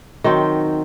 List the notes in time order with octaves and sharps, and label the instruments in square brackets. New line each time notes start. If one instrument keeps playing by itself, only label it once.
[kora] D#3 F#3 C4